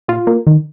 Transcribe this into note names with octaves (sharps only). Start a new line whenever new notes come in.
A#2 F4
A#3
D#3